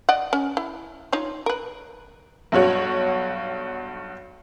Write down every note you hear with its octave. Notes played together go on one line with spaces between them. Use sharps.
D5 D#5 F#5
C#4
E4
D#4 F4 C#5
A#4 B4
B1 G2 F#4 C#5